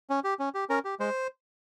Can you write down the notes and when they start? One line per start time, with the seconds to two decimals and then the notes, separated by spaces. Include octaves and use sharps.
0.10 C#4
0.24 G4
0.39 C#4
0.54 G4
0.69 C#4 A#4
0.85 G4
1.00 G#3 C5